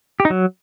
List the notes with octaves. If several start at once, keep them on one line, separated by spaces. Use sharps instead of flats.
G4
D#4
F#3